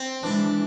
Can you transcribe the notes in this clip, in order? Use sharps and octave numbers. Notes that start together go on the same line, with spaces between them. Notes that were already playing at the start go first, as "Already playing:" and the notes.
Already playing: C4
E3 G#3 D4